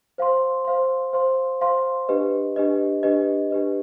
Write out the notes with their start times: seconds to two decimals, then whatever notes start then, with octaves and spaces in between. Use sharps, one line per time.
0.18 C5 F5 C6
0.65 C5 F5 C6
1.13 C5 F5 C6
1.61 C5 F5 C6
2.08 D4 G4 B4 D#5
2.56 D4 G4 B4 D#5
3.03 D4 G4 B4 D#5
3.51 D4 G4 B4 D#5